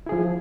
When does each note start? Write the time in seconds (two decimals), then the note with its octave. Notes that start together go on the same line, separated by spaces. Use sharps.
0.06 E4
0.09 G#4
0.12 F3